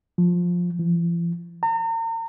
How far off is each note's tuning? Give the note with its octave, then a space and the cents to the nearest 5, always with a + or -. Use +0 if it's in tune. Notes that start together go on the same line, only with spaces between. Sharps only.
F3 +15
F3 -45
A#5 -40